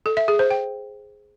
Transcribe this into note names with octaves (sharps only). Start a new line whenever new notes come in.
A4
E5
G#4
C5
G5